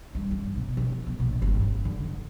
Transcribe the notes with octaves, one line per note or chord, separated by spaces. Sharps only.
G3
G2
B2
F3
B2
A#1
G1
C#4
D3
D3